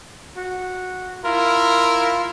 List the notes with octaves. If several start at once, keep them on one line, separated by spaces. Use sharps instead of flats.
F#4
E4 F4 A#4